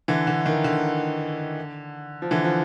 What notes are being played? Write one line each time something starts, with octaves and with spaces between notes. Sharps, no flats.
D3 E3
D3
D#3
D3
F3
D3 E3
F3